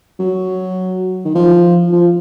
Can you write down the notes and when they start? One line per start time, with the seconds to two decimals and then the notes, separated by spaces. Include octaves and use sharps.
0.19 F#3
1.25 D#3
1.35 F3
1.93 F3